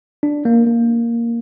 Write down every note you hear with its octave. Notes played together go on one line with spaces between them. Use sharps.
D4
A#3
A#3